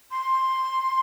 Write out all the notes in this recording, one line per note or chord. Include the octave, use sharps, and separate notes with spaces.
C6